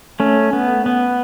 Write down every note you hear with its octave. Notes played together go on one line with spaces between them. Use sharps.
A3 C#4
B3
B3